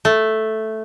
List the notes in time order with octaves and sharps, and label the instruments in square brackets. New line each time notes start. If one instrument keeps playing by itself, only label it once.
[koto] A3